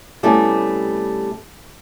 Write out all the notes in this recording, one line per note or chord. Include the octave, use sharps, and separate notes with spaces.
C3 G3 A3 B3 C#4 E4